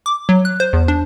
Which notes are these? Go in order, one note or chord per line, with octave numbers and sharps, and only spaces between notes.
D6
F#3
F#6
C5
E2
D4